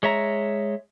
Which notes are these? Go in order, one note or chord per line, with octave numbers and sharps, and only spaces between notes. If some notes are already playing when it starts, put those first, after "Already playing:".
G#3 C#5 E5 A#5